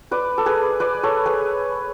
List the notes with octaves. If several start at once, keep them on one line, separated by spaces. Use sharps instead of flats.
B4 D5
A4
G#4 B4
B4 D5
A4 C#5
G#4 B4